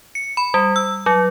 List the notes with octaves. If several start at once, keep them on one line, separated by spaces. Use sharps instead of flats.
C#7
B5
G3
E6
F#3